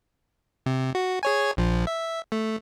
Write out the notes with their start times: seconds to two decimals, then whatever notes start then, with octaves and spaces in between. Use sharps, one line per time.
0.66 C3
0.95 F#4
1.23 G#4 C#5 G#5
1.57 A#1 F3
1.87 E5
2.32 A3